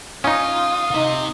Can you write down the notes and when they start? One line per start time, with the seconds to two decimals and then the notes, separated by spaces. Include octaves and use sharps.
0.24 C#4 D#4 F4 D#6
0.94 C3 D#4